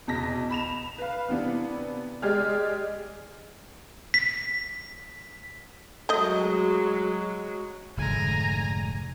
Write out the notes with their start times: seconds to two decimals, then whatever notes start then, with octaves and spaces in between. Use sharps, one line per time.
0.08 E2 B2 A5 A#6 B6
0.51 B5 E7 F7
0.98 B4 F5
1.29 C3 E3 B3 D4
2.22 G#3 G4 G#4 D5 F6
4.14 B6
6.09 F#3 G#3 A3 D#5
7.97 F1 G#2 D3 G#5 A#5